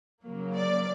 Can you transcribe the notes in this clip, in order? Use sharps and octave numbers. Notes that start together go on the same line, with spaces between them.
C#3 F#3 A#3
D5